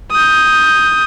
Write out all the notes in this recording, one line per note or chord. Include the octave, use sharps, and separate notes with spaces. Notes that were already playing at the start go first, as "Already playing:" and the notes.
D#6 G6